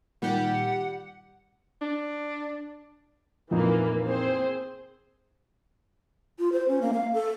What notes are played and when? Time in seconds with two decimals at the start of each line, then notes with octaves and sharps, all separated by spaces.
0.22 A#2 D#3 G3 G4 F#5
1.82 D4
3.51 F2 A#2 E3 A#3 D#4
4.04 C4 G#4 C5
6.39 F4
6.52 C5
6.68 C#4
6.82 A#3
6.93 F5
7.13 A4